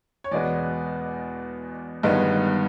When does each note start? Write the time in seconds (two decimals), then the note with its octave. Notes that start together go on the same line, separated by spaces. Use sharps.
0.24 C#5
0.31 E2 B2 G#3 B3 D5
2.03 G1 G2 D#3 G#3 B3